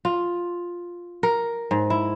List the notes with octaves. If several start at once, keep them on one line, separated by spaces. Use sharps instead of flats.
F4
A#4
G#2
E4